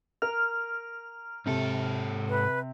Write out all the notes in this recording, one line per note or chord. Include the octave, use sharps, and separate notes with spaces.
A#4 F6
G#2 C3 A4
B4